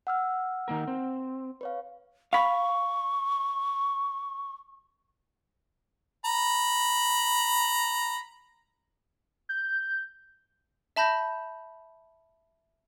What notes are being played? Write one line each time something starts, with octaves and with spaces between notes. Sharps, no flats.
F#5 E6 F6
D#3 A#3 A#4
C4
B4 C#5 F5
F5 B5 C#6
A#5 B5
G6
E5 A5 B5 G6 A#6